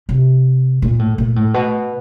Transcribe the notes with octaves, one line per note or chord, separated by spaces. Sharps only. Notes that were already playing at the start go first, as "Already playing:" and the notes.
C3
A#2
A2
A#2
A2
B2